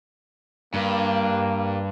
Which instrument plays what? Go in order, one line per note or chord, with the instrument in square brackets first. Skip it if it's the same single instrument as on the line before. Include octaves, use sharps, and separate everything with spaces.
[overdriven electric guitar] G2 [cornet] A#3